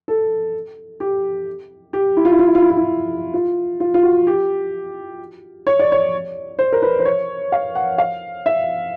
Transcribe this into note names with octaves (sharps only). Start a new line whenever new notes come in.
A4
G4
G4
E4
F4
E4
F4
E4
F4
E4
F4
E4
F4
F4
F4
F#4
G4
C#5
D5
C#5
C5
A#4
B4
C5
C#5
F5
F#5
F5
E5